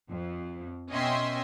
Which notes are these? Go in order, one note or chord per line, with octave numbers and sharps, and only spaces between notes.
F2
B2 C#4 D#5 E5 G5 C6